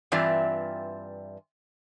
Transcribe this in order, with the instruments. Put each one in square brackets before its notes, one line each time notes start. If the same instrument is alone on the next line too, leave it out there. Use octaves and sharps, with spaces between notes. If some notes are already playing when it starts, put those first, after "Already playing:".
[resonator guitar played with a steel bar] G2 E3 C4 F4 D5 E5